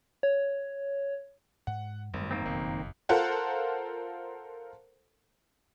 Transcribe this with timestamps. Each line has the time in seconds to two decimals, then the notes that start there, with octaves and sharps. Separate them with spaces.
0.23 C#5
1.67 G#2 F#5
2.14 G#1 F#2 G3 A3
2.31 D#3 A#3 C4
2.46 F#1 B1 F2
3.09 F4 A4 A#4 C5 F#5